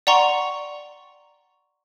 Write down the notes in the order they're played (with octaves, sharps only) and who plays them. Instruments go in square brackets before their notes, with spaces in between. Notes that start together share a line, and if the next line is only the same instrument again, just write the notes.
[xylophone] D5 F#5 G5 A#5 C6 C#6